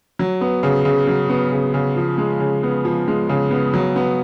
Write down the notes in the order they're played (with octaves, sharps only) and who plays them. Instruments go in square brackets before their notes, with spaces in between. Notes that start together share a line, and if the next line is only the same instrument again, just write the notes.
[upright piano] F#3
B3
C#3
C#3
F#3
B3
C#3
C#3
F3
G#3
C#3
B3
F3
G#3
C#3
B3
F#3
B3